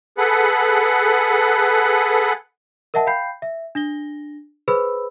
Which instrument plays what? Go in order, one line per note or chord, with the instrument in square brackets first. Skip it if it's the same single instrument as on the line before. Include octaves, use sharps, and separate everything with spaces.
[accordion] G#4 A4 B4 F#5
[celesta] A#4 D#5 E5 F#5 A5
F5 G5 B5 G6 C7
E5
D4 A#6 G7
G#4 B4 C5 B5 E6